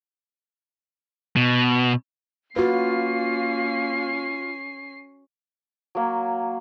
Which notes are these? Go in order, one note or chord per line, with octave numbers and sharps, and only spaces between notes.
B2
A#3 C#4 F4 F#4 B4 C7
F#3 A#3 C#5